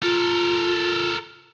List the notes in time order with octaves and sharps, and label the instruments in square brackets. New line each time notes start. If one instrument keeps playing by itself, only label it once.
[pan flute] F4 [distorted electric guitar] A4 A#4